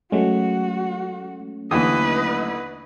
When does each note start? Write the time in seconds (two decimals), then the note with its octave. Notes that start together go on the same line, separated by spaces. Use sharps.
0.12 F#3 G#3 A3 C#4 F#4
1.71 D#2 D3 E3 B4 D#5 D#6